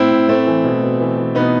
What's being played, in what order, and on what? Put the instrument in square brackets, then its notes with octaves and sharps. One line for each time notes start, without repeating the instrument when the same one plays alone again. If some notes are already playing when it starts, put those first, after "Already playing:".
Already playing: [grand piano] A2 C4 E4
A2
A2 A3 C4
E3
B2
B2
E3
E3
B2 B3 D#4